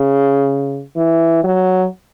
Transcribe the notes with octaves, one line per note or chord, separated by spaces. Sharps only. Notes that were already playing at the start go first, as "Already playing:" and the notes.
Already playing: C#3
E3
F#3